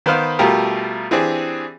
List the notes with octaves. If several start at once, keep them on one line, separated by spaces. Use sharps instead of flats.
D#3 B3 B4 C5 F5 B5
B2 G3 A3 F4 G4 A#4
E3 C4 D4 G4 G#4